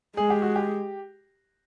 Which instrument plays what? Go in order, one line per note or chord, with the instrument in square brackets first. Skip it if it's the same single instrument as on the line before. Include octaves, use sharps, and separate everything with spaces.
[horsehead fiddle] G#3 [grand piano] G#4
[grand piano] G4
F#4
G4